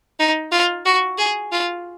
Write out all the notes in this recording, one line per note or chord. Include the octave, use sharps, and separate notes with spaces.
D#4
F4
F#4
G#4
F4